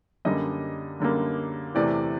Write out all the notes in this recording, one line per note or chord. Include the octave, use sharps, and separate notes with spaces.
F#2 D3 G3 A#3 D#5
F#2 D3 G3 A#3
E2 C3 E3 A3 D5